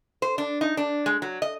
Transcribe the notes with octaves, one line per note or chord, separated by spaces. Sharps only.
C5
D4
D#4
D4
G#3
F#3
D#5